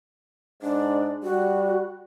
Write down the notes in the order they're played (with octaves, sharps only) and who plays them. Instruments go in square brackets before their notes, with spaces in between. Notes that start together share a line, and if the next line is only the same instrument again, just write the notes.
[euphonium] G#2 [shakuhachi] D4
[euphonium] G3 [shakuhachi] F#4